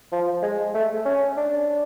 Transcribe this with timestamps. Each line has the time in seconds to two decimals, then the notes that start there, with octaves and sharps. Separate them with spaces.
0.12 F3
0.42 G#3
0.74 A3
1.05 C#4
1.37 D4